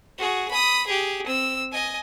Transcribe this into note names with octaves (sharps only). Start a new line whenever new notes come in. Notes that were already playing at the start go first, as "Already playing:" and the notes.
F#4 G#4
B5 D#6
G4 G#4
C4 E6
D#5 G#5